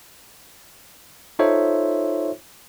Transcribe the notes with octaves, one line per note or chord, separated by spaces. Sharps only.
D#4 F4 A4 C5 C#5 E5